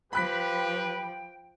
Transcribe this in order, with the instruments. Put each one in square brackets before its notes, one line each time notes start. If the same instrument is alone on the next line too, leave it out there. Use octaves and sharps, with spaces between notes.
[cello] F3 [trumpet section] G4 B4 [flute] G5 [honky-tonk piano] B5 F#6 B6